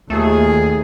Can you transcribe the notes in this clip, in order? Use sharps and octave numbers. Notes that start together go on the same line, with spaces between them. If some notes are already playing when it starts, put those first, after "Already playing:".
D#2 A#2 D#3 A3 G#4